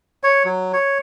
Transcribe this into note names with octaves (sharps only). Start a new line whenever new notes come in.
C#5
F#3
C#5